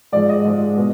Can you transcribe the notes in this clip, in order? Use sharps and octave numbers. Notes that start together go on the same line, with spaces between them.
G#2 F3 G#3 D5
D#5
G#2 F3 G#3
B2 G#3 B3